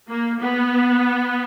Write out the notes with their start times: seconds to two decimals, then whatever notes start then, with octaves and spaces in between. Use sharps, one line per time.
0.10 A#3
0.41 B3